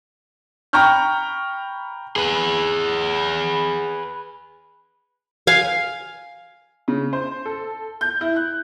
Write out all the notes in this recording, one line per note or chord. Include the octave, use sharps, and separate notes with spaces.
G5 A#5 B5 C#6 F6 G6
G#4 B4
F5 G#5
C#3
C5
A4
G6
E4
F#6